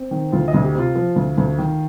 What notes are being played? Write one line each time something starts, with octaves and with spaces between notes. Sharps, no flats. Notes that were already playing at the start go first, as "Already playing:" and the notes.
Already playing: C4
D#3
D2 F4
D#5
D2
G4
C3 F4
F3
D2
D2
D#3